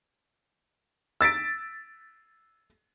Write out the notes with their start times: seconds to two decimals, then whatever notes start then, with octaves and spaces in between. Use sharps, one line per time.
1.21 E6 A6 B6 D7